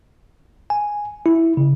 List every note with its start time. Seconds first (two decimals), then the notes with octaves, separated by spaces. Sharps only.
0.70 G#5
1.26 E4
1.57 C#3